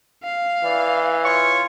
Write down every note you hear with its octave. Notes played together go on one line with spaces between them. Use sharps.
F5
E3 D5
F4 C#5 C#6